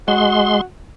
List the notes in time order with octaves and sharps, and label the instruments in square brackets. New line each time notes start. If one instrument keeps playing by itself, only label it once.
[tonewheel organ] G#3 C6 [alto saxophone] F#4